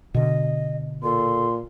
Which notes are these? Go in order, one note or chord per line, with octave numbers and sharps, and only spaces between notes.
B2 D3 D#5
A#2 A4 C6